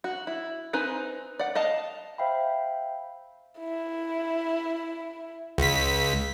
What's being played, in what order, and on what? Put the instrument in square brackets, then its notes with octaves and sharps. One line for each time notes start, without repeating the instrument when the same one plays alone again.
[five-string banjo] F#4
E4
C4 D#4 B4 G#5
D5 F#5
D#5 F5 A5
[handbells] C5 E5 F5 G5 B5
[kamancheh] E4
[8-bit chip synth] C#2 B6